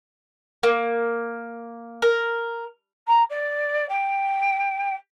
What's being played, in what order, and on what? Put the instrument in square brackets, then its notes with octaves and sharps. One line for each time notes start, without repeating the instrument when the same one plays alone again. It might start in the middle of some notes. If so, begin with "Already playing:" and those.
[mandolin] A#3
A#4
[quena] A#5
D5
G5